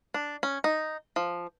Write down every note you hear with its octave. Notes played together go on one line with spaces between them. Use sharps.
D4
C#4
D#4
F3